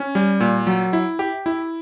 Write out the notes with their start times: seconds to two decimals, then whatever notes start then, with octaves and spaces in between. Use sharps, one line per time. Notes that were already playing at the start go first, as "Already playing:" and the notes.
Already playing: C#4
0.15 G3
0.40 A#2
0.67 F#3
0.93 E4
1.19 G4
1.46 E4